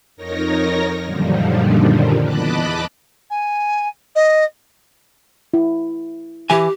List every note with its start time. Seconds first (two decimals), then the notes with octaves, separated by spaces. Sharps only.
0.17 F2 D#4 A#4 C#5 A#6
1.04 F#2 A#2 D3 D#3 F3 G3
2.23 E2 D#5 A5 B5 D6 F#6
3.30 G#5
4.15 D#5
5.54 E4
6.50 E3 G4 G#5